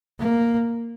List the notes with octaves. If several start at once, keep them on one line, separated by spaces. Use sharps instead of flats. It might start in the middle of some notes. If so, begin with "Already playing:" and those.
A#3